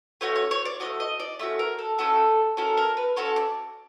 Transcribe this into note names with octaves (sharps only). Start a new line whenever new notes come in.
A3 C#4 F#4 C#5
C#5
C#5
D5
A3 C#4 F#4 D#5
D#5
D5
A3 C#4 F#4 E5
A#4
A4
A3 C#4 F#4 A4
C#4 F#4 A4 A#4
A#4
B4
C#4 F#4 A4 C#5
D5